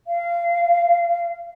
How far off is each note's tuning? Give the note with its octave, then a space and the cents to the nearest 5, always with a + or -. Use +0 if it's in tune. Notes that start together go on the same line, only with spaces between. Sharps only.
F5 -25